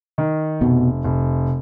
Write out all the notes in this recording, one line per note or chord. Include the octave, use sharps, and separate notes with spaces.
D#3
F1 B2
F1